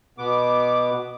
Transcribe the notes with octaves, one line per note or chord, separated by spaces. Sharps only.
B2 B3 D6